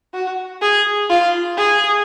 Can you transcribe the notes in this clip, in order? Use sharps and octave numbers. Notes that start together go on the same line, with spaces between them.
F#4
G#4
F4
G#4